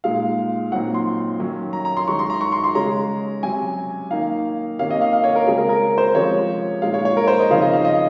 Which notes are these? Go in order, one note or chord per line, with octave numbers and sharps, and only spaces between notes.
A#2 G#3 D#4 F5
A#2 F#3 C4 D#4 F#5
C6
D#3 F#3 C#4
A#5
A#5
C6
D#3 G#3 D#4 C#6
C6
A#5
C#6
C6
C6
C#3 G#3 C#4 A#5
C3 F#3 C#4 G#5
D#3 A#3 D#4 F5
C3 D#3 A#3 C#4 F5
D#5
F5
F5
C#5
A#4
C#3 G#3 C4 G#4
A#4
A#4
C5
C3 F3 G#3 C#4 C#5
A#2 G#3 D#4 F5
C#5
C#5
A#4
C5
D#5
C#3 F3 C4 D#4 F5
D#5
F5
D#5